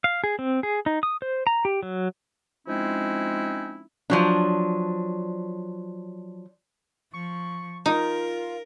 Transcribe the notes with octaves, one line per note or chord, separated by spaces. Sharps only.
F5
G#4
C4
G#4
D#4
D#6
C5
A#5
G4
F#3
F3 G#3 C4 C#4 D#4 E4
F3 F#3 D4
F3 C#6
D#4 F4 A#4